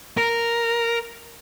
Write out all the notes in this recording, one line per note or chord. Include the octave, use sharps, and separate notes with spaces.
A#4